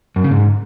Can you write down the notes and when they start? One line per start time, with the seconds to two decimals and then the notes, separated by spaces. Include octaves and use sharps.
0.16 F#2
0.24 C#3
0.31 G#2